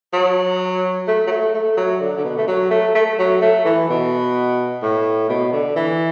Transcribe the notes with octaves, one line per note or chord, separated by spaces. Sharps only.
F#3
A3
F#3
A3
A3
F#3
D3
D3
B2
A3
F#3
A3
A3
F#3
A3
E3
B2
A2
B2
D3
E3